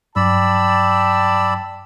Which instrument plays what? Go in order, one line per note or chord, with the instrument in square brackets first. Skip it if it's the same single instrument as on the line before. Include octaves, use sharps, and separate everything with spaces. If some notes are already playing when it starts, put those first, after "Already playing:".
[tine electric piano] G2 F#3 [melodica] D5 B5 E6 [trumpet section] G5 A5